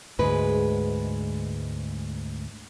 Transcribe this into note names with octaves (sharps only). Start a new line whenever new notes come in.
D2 G#2 G#3 B4